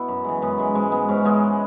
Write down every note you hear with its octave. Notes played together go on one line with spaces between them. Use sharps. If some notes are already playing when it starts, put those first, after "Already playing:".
Already playing: B2 B3 E4
F#2
E3 G#3
F#2 B3
E3 G#3
G#2 G#3
G#3 B3
G#2 C#4
G#3 B3